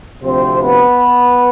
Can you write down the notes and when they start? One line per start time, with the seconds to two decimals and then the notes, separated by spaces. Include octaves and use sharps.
0.23 D2 C3 F3 C4 C5
0.61 B3 B4